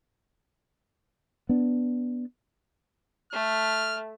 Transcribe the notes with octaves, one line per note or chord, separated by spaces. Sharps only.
B3 D4
A3 F6